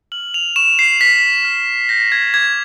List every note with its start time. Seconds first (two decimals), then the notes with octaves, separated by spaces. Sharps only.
0.12 F6 F#7
0.34 F7
0.56 C#6 E7
0.79 C7
1.00 F6 B6
1.44 F6
1.89 G6 A#6
2.12 G#6
2.34 D6 G#6